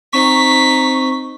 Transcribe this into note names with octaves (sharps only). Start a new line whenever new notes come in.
C4 D#4 C#6 B6